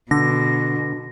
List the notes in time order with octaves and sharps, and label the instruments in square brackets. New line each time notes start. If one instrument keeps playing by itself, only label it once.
[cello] B2 [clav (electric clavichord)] D3 [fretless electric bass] D4 [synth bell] A#6